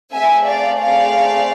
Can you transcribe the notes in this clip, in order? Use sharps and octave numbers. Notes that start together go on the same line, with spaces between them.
A3 C4 G#4 E5 G#5
D5 F5
D5 F5